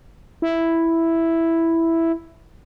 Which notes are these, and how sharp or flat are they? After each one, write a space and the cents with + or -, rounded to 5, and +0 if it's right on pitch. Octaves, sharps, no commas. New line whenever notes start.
E4 +0